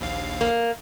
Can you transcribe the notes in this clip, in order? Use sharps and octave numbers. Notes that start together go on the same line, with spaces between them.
A#1 D#2 F5
A#3